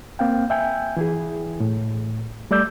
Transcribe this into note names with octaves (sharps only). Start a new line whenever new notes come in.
A#3 C4 F5 G5
E5 G5 G#5
E3 E4 G#4
A2
G3 A3 D5 E6 G6